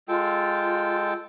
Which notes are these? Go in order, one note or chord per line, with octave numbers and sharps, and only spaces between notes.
G#3 F4 A4 G5